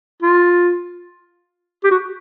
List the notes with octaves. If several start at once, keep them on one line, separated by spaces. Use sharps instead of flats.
F4
G4
F#4